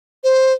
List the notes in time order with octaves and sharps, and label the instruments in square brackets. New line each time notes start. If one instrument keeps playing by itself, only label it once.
[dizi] C5